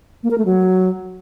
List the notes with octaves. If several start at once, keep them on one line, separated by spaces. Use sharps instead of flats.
A#3
A#4
A3
F#3